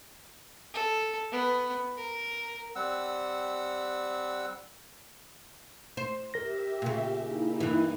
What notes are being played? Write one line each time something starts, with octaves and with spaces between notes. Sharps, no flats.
A4
B3
A#4
G3 C4 F#5 E6
C5
G4 A#4 E5 A#6
A#2 C#3
A#3 D#4 E4
G2 E3